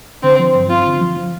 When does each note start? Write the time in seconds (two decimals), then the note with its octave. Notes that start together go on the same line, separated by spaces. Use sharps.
0.23 D3 C4
0.39 F3
0.55 G2
0.70 C4 F4
0.86 D3
1.01 F3
1.17 F3